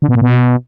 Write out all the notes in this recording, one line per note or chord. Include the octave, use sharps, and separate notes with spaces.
D3
B2
A#2
B2